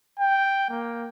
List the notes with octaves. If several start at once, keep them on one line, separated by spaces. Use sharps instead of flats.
G5
A#3